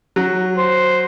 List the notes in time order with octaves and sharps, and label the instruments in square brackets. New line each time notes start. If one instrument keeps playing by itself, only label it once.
[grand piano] F#3
[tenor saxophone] C5